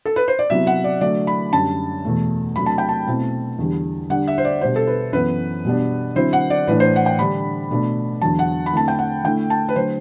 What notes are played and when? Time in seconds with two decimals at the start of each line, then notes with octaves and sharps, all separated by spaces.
0.05 A4
0.16 B4
0.28 C5
0.39 D5
0.50 C3 F#3 B3 E4 E5
0.67 F#5
0.84 D5
1.01 D3 F#3 A3 D5
1.27 B5
1.53 F#2 D3 G3 A5
2.05 E2 B2 A3
2.56 C3 F#3 A3 D4 B5
2.66 A5
2.78 G5
2.89 A5
3.07 B2 A3 C4 E4
3.58 E2 D3 G3
4.10 D3 G3 D4 F#5
4.27 E5
4.38 C5
4.45 D5
4.61 B2 G3 D4 C5
4.76 A4
4.87 B4
5.13 F#2 E3 B3 B4
5.65 B2 G3 B3 D4
6.16 D3 F#3 C4 E4 C5
6.33 F#5
6.50 D5
6.68 A2 E3 A3 D4 B4
6.80 C5
6.96 F#5
7.06 G5
7.19 D3 G3 D4 B5
7.71 B2 A3 D4
8.22 E2 D3 F#3 A5
8.39 F#5
8.66 B5
8.73 D3 A3 C4 E4 A5
8.88 G5
8.99 F#5
9.24 D3 A3 E4 G5
9.50 A5
9.69 B4
9.76 D3 F#3 A3 C5